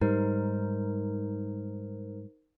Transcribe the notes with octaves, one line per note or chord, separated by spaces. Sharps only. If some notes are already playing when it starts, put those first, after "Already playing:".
G#2 G3 D#4 A#4 C5